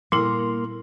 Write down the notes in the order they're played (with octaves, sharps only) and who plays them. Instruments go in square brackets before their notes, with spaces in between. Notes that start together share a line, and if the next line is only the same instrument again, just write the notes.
[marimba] A#2 G3 E4 [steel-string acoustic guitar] A#3 [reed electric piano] C6